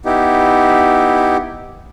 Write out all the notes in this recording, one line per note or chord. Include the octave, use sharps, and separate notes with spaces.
B3 D#4 E4 G4